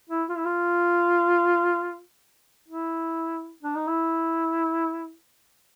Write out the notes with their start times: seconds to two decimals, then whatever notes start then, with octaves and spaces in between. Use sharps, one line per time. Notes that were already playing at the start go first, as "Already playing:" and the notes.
0.09 E4
0.29 F4
0.37 E4
0.45 F4
2.68 E4
3.63 D4
3.76 D#4
3.87 E4